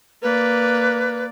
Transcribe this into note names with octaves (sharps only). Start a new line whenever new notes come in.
A#3 B4 D5